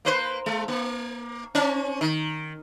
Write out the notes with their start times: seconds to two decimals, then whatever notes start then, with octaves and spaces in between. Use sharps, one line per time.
0.05 A#3 B4 C5
0.46 G#3
0.68 A#3
1.55 C4 C#4
2.01 D#3